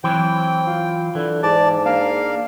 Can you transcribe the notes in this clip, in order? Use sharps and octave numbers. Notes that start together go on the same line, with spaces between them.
E3 F#3 C4 G5
F4
D3 E3
G#2 D5 A5
A#3 D4 F5